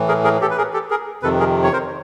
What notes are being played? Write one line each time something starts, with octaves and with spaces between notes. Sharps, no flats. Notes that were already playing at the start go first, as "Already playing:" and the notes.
Already playing: A2 E3
G#4 A#4
G#4 A#4
G4 A4
B4
G#4 A#4
G4 A4
G#4 A#4
F2 C3 D#3 A4 B4
G#4 A#4
C#5
A#4 C5